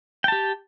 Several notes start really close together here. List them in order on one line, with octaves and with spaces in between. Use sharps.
G5 A5 G4